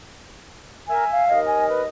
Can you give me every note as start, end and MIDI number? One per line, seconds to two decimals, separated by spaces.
0.90 1.04 70
0.90 1.29 76
0.90 1.29 80
1.11 1.39 77
1.30 1.88 39
1.30 1.88 70
1.30 1.88 75
1.46 1.64 80
1.69 1.82 71